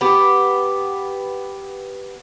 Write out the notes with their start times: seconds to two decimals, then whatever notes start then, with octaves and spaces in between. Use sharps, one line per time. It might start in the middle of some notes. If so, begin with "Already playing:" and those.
0.01 B3 G4